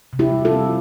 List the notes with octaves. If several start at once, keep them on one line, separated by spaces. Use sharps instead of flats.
C3
E4 G4
G3
F4 A4
C4